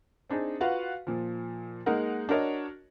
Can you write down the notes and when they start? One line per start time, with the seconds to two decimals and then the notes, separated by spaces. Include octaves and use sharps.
0.30 C4 D4 D#4 G#4
0.60 F4 F#4 B4 F5 F#5
1.07 A#2 F3
1.86 G#3 A#3 D#4 A#4 F#5
2.29 D4 F#4 A#4 C#5 D#5